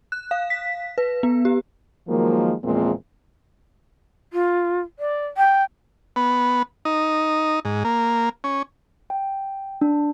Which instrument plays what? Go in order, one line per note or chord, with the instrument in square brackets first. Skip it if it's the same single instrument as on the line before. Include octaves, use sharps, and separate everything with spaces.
[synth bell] F#6
F5
B6
B4
B3
G4
[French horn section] D#3 F3 F#3 G#3 A#3
E2 A#2 F3 G#3 A#3 C4
[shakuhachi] F4
D5
G5
[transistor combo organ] B3
D#4
G#2
A#3
C#4
[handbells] G5
D4